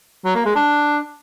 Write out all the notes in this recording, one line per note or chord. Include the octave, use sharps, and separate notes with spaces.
F#3
A#3
G#3
D4